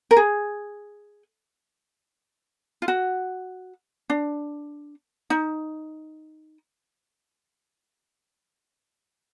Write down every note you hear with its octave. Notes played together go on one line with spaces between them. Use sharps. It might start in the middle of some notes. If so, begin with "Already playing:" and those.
A#4
G#4
F4
F#4
D4
D#4